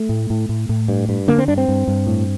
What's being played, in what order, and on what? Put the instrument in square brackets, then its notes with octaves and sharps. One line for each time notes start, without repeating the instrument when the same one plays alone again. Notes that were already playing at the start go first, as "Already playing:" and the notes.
Already playing: [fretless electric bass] A3
A2
A2
A2
A2
G2
G2
D3 A#3
C4
G2 D4
C4
G2
G2
A2